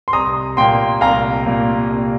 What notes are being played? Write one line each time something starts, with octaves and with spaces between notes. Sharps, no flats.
C6
C2 A#5 D#6
A#2 A#3 G5 C6
C2 F5 A#5
A#2 A#3
C2